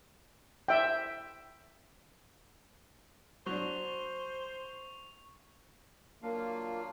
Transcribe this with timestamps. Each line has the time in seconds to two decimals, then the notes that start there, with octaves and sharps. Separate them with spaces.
0.68 E5 G5
3.46 F#3 D4 C5 C#6 F7
6.23 F#3 A#3 D4 F4 F5